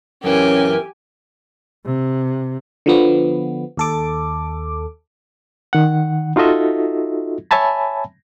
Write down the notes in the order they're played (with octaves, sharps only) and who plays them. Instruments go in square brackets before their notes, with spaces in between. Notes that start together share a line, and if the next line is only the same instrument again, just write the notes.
[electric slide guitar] F#2 E3 [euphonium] C#4 [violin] G4 G#5 [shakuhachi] A#4
[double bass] C3
[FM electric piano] D3 F3 B3
D#2 A4 D6
[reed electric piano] D#3 F#5
D#4 F4 F#4 A4 D#5 E5
C#5 E5 G#5 A5 B5